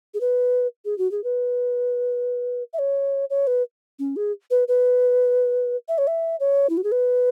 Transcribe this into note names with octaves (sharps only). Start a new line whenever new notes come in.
G#4
B4
G#4
F#4
G#4
B4
E5
C#5
C#5
B4
C#4
G#4
B4
B4
E5
C#5
E5
C#5
E4
F#4
G#4
B4